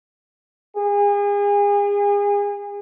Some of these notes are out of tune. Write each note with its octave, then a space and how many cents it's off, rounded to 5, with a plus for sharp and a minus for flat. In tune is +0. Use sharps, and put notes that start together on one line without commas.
G#4 -35